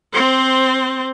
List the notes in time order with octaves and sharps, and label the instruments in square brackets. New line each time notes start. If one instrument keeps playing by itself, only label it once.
[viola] C4 C5